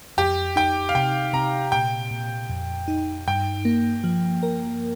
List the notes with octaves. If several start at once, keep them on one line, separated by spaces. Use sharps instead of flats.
F2 G4
D#4 G5
F5
C3 G5
C3 A#5
A#2 G5
A#2
F2
D#4
G2 G5
A#3
F3
A#4